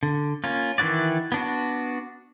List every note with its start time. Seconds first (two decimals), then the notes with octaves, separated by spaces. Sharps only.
0.03 D3
0.44 A#3 C#4 F4
0.78 D#3 E3 E4 F#4 D5
1.32 B3 D4 F#4